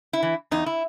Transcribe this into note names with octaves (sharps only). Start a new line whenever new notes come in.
E4
E3
E2 D#4
E4